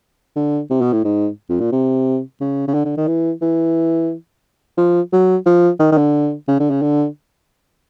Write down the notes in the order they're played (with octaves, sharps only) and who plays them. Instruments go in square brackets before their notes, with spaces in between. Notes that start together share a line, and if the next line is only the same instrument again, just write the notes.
[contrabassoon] D3
C3
B2
A2
G#2
F2
A#2
C3
C#3
C#3
D3
D3
D#3
E3
E3
F3
F#3
F3
D#3
D#3
D3
C#3
D3
C#3
D3